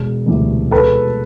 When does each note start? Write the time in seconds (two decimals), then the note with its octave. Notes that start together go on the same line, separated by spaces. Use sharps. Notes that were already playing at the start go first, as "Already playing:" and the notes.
Already playing: E1
0.26 D2 C3 E3 G3
0.71 E1 A4 B4